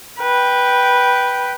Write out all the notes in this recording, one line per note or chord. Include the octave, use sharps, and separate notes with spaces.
B4 G5